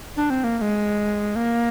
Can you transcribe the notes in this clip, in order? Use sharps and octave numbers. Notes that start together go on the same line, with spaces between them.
D4
C4
A#3
A#3
G#3
A#3